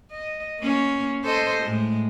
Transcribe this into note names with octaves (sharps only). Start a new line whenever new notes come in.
D#5
A#3 C#4
A4 C5 D#5
A2 G#3